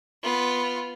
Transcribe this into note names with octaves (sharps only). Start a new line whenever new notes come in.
B3 F4